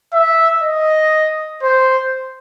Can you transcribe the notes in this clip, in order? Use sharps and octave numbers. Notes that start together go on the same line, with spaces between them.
E5
D#5
C5